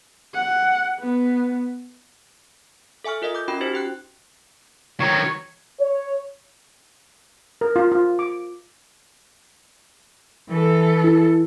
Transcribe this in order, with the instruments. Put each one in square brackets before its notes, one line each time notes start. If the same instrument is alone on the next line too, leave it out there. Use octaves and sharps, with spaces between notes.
[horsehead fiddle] F#5
B3
[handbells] A4 E5 G#5 C#6 F6
F4 A#4 D#5 E5
D6 G6
C#4 F4 F#4 G5 B5
D#4 F#4 G4 C5
G4 G5 F#6
[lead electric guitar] D#3 F#3 [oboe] C#5
[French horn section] C#5
[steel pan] A#4
F4
F4
D6
[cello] E3 A4
[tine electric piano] E4